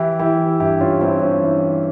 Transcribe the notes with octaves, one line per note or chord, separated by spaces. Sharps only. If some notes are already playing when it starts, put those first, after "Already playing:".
Already playing: E3 E4 G4
E3 E4 G4
G2 E4 G4
C#4 F4
G2 C4 E4
C#4 F4
E3